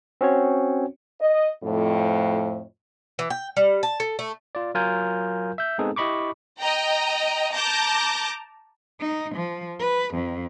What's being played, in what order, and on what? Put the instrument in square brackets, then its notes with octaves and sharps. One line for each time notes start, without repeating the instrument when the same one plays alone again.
[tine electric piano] C4 C#4 F#4 C#5
[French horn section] D#5
F2 A2
[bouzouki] E3
G5
G3
A5
A4
A3
[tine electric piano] F4 D5
F#3 F4 A#4 G#5 G6
E5 G6
G#3 B3 C4 D#4 G#4 A4
E4 G4 D#5 B5 C#6 D6
[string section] D#5 G5 A#5
A5 A#5 D6 G6 A#6
[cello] D#4
F3
B4
F2